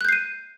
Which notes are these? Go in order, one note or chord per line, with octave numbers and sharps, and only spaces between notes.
F#6 G6 C7 D#7